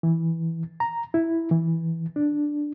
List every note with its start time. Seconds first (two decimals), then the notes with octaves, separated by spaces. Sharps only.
0.03 E3
0.80 A#5
1.14 E4
1.51 E3
2.16 D4